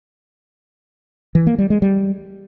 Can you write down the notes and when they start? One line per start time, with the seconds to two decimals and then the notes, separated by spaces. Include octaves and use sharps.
1.35 E3
1.47 A#3
1.58 G3
1.70 G#3
1.82 G3